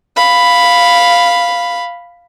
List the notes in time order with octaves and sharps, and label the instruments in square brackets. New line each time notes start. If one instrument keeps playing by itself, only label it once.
[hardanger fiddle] F5 B5